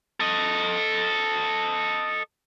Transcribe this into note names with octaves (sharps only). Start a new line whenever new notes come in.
A4 D#5